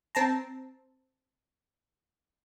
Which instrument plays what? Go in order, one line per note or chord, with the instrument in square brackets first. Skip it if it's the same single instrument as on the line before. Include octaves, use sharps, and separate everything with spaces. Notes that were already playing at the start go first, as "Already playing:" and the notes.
[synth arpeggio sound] C4 A5 A#5